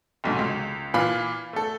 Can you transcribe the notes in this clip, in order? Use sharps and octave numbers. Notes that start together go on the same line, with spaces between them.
F1 B1 G#2
C#2
A#2 E3 F4 B5
A3 A4